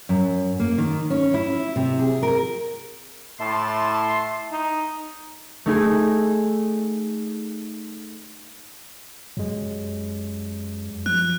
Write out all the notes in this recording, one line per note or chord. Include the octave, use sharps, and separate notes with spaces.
F#2
A#3
D#3
C#4
E4
C3
G#4
A#4
A2 E4 A5 C6
D#4
A3 D#4 G#4
F#2 F#3 G#3
F3 F#6